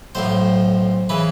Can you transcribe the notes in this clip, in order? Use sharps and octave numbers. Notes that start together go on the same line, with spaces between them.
B1 A2 F3 C5
C#3 E3 B4